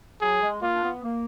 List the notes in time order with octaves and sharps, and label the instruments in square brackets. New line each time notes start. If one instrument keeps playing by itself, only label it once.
[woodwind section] F#3 [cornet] G#4
[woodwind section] G#3
[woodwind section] A#3 [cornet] F4
[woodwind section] D4
B3
A#3